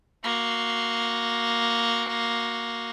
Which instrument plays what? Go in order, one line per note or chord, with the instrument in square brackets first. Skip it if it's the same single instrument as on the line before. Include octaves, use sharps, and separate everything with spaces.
[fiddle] A#3 F#4